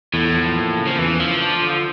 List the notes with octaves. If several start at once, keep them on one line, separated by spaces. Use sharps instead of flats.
E2 A2
F3
A#3
C#3
F3
E2 E3
F3 A3
D4
D3